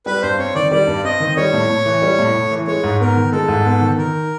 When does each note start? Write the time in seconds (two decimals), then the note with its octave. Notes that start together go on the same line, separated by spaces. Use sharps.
0.06 G3 B4
0.22 G2 C5
0.39 C4 C#5
0.55 D#3 D5
0.71 G3 D5
0.87 G2
1.04 C4 D#5
1.20 D#3
1.37 G3 C#5
1.53 A2
1.69 A2
1.86 E3
2.02 G3
2.18 A2
2.34 A2
2.51 E3
2.67 G#3 C#5
2.84 G#2
3.00 B3 A#4
3.16 D#3
3.32 G#3 A4
3.48 G#2
3.65 B3
3.81 D#3
3.98 D#3 A#4